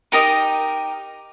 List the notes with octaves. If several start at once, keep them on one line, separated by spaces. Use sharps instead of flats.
D#4 G4 A#4 D#5